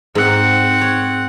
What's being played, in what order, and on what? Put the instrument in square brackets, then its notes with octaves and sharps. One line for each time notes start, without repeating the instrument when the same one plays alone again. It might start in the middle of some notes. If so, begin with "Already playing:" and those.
[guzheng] G#2 [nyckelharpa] C4 F#5
[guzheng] C#5